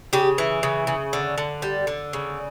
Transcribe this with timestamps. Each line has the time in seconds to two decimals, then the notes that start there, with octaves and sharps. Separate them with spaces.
0.13 C#3 G4
0.38 E3
0.63 C#3
0.87 C#3
1.13 D3
1.38 D3
1.62 G3
1.87 D3
2.13 C#3